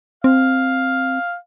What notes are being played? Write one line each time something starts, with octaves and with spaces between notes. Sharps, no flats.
C4 F5